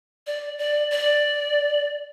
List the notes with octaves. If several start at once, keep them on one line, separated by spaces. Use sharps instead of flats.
D5
D5
D5